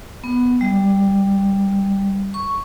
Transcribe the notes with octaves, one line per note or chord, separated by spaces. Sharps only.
B3
G3
C#6